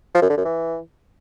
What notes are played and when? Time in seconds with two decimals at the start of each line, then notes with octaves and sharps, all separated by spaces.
0.15 F3
0.22 F#2
0.30 D3
0.37 F#2
0.45 E3